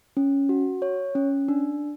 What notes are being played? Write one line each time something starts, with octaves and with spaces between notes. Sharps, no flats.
C#4
F#4
C#5
C#4
D4